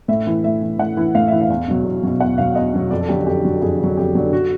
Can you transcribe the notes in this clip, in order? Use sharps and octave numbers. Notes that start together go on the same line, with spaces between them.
A2 E5
E3
A2 E5
E3
A2 F#5
E3
A2 F5
E3 E5
F5
E2
B2 F#3
E2
B2 F#3
E2 F#5
B2 F#3 F5
E2 D#5
B2 F#3
F2 D5
A4
D3 F#3 G4
F#4
F2 G4
D3 F#3
F2 G#4
D3 F#3
F2 G4
D3 F#3
F#4